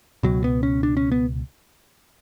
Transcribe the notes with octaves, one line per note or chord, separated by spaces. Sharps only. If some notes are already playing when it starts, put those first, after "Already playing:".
C#2 B2 F#3
B3
C#4
D4
C#4
B3